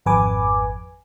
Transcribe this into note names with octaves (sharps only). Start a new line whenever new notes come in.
G#1 F2 B4 G#5 D6